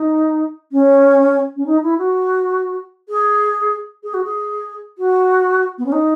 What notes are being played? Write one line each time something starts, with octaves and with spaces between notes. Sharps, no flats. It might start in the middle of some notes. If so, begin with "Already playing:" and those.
Already playing: D#4
C#4
C#4
D#4
E4
F#4
G#4
G#4
F#4
G#4
F#4
B3
C#4
D#4